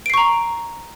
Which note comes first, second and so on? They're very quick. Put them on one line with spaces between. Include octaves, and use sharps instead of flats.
D7 C7 C#6 A#5